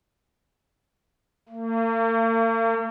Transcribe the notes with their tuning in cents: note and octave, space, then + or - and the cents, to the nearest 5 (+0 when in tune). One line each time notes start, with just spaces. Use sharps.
A#3 -45